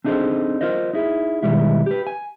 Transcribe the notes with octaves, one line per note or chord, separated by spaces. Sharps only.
C4 D4 D#4 G#4 A4 C5
F4 A#4 C5 D#5
D#4 E4 G#4
B2 D#3 G3 G#3 E4
G4 B4
G#5